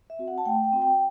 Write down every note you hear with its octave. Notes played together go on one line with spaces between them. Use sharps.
E5
C4 F#4
F#5
A5
A3 G5
G5
C4 F#4
G5